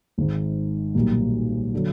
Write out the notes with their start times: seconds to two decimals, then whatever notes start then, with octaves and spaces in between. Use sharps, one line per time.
0.18 G#1 G#2 D#3
0.94 B1 A#2 G3 A#3
1.74 D3 F#3